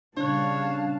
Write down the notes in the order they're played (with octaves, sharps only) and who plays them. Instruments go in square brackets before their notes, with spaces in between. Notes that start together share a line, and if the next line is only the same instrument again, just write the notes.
[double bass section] A#2 C#3 G3 [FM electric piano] D4 F#6 [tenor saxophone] C#5 [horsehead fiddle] F5 A5